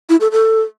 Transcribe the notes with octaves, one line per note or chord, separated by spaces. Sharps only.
E4
A4
A4